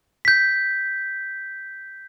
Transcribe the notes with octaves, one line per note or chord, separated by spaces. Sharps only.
G6 B6